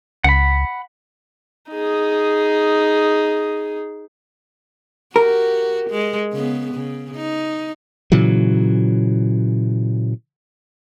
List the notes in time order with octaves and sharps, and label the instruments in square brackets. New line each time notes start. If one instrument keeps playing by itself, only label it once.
[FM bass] C#2 [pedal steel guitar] F#5 B5
[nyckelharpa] D#4 G#4
[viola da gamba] F#4 G4 [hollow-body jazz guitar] A#4
[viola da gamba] G#3
C#3 B3
C#3
D#4
[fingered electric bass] A#2 C#3 E3 F#3